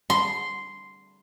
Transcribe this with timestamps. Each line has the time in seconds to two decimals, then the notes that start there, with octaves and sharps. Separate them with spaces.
0.10 C6